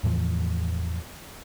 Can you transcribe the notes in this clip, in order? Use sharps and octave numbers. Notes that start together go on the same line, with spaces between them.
E2 A2 E3 F3